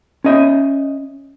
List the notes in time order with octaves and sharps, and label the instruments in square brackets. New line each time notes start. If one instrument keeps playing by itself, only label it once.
[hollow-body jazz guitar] C#4 D#5 E5